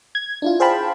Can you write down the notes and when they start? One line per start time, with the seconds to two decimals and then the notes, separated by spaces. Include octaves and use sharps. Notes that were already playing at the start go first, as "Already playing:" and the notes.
0.15 G#6
0.42 D4 E4 F4
0.60 G#4 C5 F5 G5 A5 B5